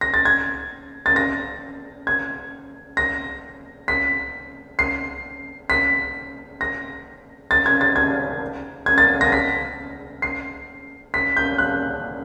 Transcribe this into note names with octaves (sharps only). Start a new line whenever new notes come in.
A#6
A6
G#6
A6
A#6
G#6
A#6
B6
C7
B6
A#6
A6
G#6
A6
G#6
G#6
A6
A#6
B6
C7
B6
G6
F#6